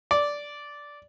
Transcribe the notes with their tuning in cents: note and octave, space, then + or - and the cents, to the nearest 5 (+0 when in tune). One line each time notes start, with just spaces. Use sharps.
D5 -10